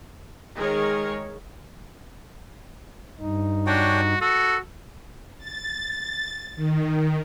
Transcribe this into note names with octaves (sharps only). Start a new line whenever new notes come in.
D#3 G#3 G#4 A#4 C#5
G2 D#4
D4 F#4 C#5 G5
F#4 A4
A6
D#3